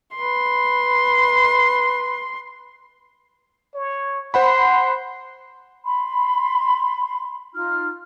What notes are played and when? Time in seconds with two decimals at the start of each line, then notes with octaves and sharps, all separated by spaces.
0.16 B4 C6
3.74 C#5
4.34 C5 F#5 B5 C6
5.84 B5 C6
7.54 D#4 F4 F6